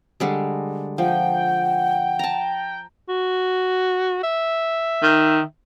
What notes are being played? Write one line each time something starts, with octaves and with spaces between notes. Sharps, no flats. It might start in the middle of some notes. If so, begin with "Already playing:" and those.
D3 G3 G#3
F3 F#5 G5
A5 A#5
F#4
E5
D#3